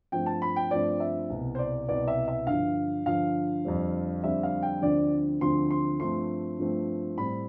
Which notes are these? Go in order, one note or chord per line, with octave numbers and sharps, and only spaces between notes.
G2 F3 A3 C4 G5
A5
B5
G5
G2 F3 A3 C4 D5
E5
C2 B2 B3
C5
D5
C2 B2 B3 D5
E5
E5
G2 D3 F3 F5
G2 D3 F3 F5
F2 D3 G3 C4
F2 D3 G3 C4 E5
F5
G5
D2 D3 F3 C4 D5
D2 D3 F3 C4 C6
C6
G2 F3 A3 C4 C6
G2 F3 A3 C4
A2 G3 C4 B5